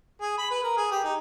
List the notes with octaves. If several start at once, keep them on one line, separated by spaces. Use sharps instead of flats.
G#4
B5
B4
A#4
G#4
G4
D#4